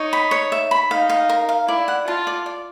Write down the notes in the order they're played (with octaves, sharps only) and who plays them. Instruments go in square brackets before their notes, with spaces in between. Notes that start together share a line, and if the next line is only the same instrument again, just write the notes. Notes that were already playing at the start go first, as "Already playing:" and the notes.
Already playing: [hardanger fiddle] D#4 [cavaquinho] C#5
[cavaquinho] B5
C#5
E5
B5
[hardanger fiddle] D#4 [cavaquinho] F5
[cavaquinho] F5
A#4
F5
[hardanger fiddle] E4 [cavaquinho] D5
[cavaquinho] F#5
[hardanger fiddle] F4 [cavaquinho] A5
[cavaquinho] D5
D5